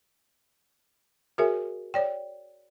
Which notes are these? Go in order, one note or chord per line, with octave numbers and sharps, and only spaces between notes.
F#4 G#4 A#4 C#5 E5 G#5
C#5 D5 G5